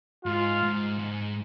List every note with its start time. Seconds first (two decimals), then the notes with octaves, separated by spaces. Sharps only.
0.25 G#2 F4
0.62 G#2
0.99 G#2